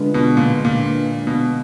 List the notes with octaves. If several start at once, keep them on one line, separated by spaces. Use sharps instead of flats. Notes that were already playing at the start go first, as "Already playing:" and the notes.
Already playing: D3 G#3 D4 F4 B4
B2
A#2
A#2
B2